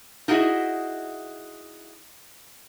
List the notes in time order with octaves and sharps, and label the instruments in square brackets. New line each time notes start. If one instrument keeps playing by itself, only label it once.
[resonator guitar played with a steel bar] D#4 E4 F#4 G#4 D#5 E5